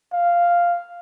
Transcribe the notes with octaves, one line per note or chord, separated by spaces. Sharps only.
F5